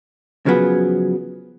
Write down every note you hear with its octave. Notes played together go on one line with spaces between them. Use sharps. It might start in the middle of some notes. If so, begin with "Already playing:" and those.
C#3 F3 F#3 B3 G#4